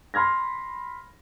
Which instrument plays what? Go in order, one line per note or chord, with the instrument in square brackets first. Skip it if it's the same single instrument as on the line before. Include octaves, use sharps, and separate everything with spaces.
[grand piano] B5 C6 F6 G#6 A#6